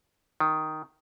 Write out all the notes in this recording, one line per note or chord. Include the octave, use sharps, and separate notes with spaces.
D#3